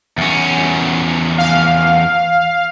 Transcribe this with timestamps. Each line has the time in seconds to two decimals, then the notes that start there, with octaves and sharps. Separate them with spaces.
0.18 E2 C#4
1.38 F5